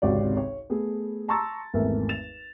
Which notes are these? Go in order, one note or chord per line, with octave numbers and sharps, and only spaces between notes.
G#1 C#2 C3 F#4 C#5 D5
C#5
A3 B3 G#4
A5 A#5 C6 C#6 E6 A6
G#1 E2 A3 A#4 E5
A6 E7 F7